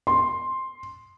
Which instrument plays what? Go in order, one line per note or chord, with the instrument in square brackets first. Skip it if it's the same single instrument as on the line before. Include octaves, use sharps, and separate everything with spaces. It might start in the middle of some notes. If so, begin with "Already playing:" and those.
[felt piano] C6